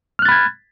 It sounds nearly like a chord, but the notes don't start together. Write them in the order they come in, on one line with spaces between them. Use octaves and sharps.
F6 F#6 A6 B5 G#6